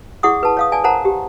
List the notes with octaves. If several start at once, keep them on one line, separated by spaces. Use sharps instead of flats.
E4 G#4 D5 F#5 C#6 D#6
B4 A5
C#5 F5 D#6
D5 G#5 A5
A#4 C5 F#5 A5 A#5
G4